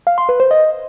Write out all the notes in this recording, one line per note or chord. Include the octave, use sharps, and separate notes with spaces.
F5
C6
B4
C5
D#5